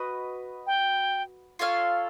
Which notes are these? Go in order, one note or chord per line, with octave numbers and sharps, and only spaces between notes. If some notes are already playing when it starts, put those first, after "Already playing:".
Already playing: F#4 B4 D#5
G5
F4 A4 C#5 F5